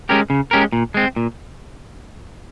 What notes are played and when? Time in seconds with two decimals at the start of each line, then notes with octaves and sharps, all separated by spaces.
0.09 G#3 C#4 G4 A#4
0.30 C#3
0.51 G#3 C#4 G4 A#4
0.72 A#2
0.94 G#3 C4
1.16 A#2